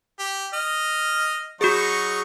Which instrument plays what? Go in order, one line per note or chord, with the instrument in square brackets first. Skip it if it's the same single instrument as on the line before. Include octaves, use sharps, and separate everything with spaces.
[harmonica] G4
D#5 F6
[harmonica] F#3 D#4 C#6 [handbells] F#4 G#4